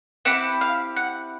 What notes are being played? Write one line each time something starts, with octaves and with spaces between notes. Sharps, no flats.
C4 E4 G4 F#5
F5
F#5